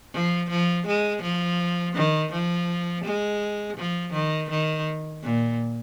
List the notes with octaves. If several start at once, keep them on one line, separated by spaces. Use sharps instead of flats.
F3
F3
G#3
F3
D#3
F3
G#3
F3
D#3
D#3
A#2